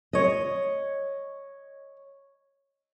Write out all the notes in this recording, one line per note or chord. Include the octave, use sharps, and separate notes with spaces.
C#5 D#5